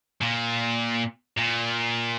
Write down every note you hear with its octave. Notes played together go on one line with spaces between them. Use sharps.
A#2
A#2